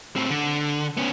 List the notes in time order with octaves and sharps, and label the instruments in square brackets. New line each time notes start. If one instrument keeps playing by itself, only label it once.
[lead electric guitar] A2 C4
D3
B3 C#4